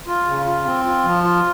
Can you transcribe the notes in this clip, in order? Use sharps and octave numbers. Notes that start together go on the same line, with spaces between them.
F4
C#3
F4
C4
F4
F3
F4